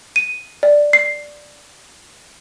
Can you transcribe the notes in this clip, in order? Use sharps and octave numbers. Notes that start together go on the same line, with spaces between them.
D#7
D5
C7